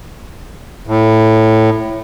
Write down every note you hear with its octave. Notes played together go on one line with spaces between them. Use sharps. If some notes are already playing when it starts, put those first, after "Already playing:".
A2